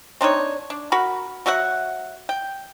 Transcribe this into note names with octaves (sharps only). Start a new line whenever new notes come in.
C4 D4 D#4 C#5
D4
F#4 A#4 B5
F#3 F#4 E5 F#5
G5